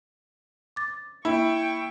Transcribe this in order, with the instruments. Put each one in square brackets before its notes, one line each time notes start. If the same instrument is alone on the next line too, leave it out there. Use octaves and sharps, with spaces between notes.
[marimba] D6 A6
[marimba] A#3 [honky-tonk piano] E4 [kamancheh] G5 C#6